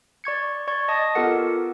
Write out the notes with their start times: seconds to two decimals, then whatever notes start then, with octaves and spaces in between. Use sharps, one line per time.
0.24 D5 C#6 G#6 C#7
0.68 D5 C#6 G#6
0.88 D#5 A5 D#6
1.15 B3 F4 G4 A4 A#4 F#5